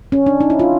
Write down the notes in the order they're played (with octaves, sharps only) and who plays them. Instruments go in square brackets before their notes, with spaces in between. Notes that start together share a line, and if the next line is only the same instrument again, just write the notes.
[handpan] C#4
D4
D#4
E4
F4